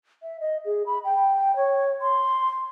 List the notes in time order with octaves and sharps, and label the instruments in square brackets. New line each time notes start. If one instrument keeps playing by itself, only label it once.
[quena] E5
D#5
G#4
B5
G5
C#5
C6